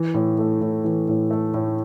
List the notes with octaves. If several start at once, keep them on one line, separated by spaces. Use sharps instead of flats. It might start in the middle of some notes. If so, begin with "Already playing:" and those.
Already playing: E3
A2
A3
A2
E3
A2
A3
A2